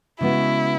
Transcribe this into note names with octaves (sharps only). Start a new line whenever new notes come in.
C#3 G#3 B3 E4 F#4